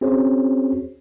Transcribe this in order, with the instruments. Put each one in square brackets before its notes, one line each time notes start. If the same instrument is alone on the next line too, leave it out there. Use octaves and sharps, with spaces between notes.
[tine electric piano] C4 C#4 F#4 G#4 C5 C#5